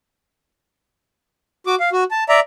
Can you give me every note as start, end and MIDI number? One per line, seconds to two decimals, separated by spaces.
1.67 1.75 66
1.67 1.75 86
1.80 1.89 77
1.92 2.04 66
2.11 2.24 81
2.29 2.40 74
2.29 2.40 76
2.29 2.40 82